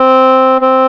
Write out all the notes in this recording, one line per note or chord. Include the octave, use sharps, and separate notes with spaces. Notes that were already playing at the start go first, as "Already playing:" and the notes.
Already playing: C4
C4